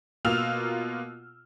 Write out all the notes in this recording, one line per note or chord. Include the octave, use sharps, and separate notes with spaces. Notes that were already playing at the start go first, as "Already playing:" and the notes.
B2 A#3 F4 E6 F6 F7